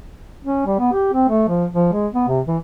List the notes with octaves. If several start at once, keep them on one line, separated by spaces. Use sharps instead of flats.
C#4
G3
B3
G4
C4
A3
F3
F3
G#3
B3
C3
E3